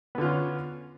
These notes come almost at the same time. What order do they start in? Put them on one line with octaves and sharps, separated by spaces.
B3 D3 F4 C#4